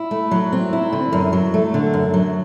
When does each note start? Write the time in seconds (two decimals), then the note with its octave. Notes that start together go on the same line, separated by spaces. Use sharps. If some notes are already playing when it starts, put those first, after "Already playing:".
Already playing: E4
0.11 A3
0.31 F#3
0.52 C4
0.73 E4
0.93 D3
1.13 F#2
1.33 F#3
1.54 A3
1.74 D3
1.94 F#2
2.14 F#3